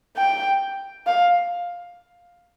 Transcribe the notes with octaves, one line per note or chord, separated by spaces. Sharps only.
G5
F5